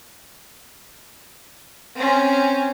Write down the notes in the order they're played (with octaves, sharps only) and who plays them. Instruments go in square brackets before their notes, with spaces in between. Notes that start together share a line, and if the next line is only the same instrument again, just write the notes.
[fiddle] C4 C#4